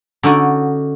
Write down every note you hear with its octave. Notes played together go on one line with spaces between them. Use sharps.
D3 C#4 D#4 F#4 D5